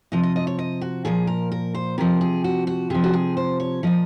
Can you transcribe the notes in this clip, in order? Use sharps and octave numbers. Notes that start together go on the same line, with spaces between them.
C3 F3 D#5
D#5
D#5
C#5
D#5
F#4
A#2 F3 G#4
A#4
A#4
C5
C3 F3 A#4
G#4
F#4
F#4
C3 F3 G#4
F#4
G#4
C5
C#5
A#2 F3 D#5